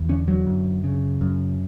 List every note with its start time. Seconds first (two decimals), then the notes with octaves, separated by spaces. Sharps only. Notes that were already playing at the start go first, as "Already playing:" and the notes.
Already playing: E2
0.09 D3 C#4
0.28 F#3
0.47 F#2
0.84 C#3
1.21 F#2